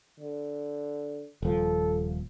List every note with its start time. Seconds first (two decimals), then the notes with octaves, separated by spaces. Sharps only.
0.20 D3
1.42 D#1 F3 A4